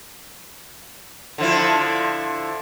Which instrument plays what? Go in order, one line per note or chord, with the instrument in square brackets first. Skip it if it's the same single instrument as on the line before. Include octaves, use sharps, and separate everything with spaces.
[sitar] D3 F3 E4